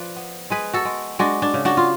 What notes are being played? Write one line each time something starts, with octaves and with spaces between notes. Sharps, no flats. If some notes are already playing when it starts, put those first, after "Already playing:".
Already playing: F3 B4 D5
B3
G#3 G#4 B4
F#4 A4
G#3
G#3 D4 F#4
D4
C#3
D4 F#4
F4